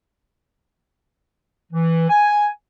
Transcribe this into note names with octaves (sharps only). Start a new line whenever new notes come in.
E3
G#5